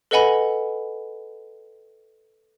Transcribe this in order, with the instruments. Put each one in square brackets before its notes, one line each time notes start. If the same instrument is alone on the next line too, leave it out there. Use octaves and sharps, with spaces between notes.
[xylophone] A4 B4 D#5 F#5 G#5 B5